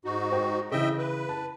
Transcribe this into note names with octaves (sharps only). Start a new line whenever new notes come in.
G#2 D#4 F#4
C5 G5
C#3 E3 D#5 E5 G5
B4
A5